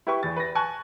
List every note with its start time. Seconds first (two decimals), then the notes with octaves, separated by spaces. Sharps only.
0.07 E4 G4 B4 G5 C#6
0.23 E2 A6
0.36 B4 A#6
0.55 G#5 A5 C#6 F#6